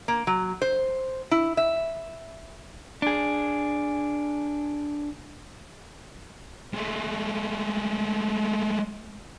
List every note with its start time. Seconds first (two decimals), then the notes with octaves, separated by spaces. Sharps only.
0.08 A#3
0.27 F#3
0.62 C5
1.31 E4
1.57 E5
3.02 D4 G#4
6.74 G#3 A3